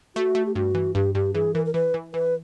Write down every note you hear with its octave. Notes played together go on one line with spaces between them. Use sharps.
A3 F#4
A3
G4
G2 F#4
E3
G2 G4
G2 G4
E3 G#4
E3 A#4
A#4
E3 B4
E3
E3 B4